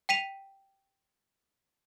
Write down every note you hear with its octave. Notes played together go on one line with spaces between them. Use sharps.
G5 B6 D#7 F7